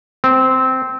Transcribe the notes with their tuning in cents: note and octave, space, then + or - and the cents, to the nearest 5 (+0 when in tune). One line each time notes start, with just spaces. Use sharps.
C4 -10